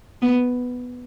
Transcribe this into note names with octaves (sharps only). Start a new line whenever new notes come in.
B3